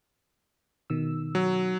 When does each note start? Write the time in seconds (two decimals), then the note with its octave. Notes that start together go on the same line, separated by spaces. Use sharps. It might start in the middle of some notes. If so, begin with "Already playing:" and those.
0.90 B2 D#3 E6
1.35 F#3